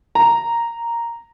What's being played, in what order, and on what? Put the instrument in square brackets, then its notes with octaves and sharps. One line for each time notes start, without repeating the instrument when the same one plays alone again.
[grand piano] A#5